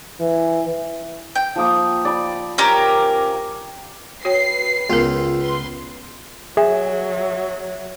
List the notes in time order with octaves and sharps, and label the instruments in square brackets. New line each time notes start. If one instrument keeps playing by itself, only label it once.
[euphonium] E3
[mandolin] G5
[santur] F3 A#3 D#6
D5 B5
[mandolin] C#4 G4 A#4
[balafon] F#4 C#5 G5 [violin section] B4 C7
[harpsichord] C#2 F4 [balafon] B3 A#4
[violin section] B4 C6
[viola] F#3 [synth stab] G#4 [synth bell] E5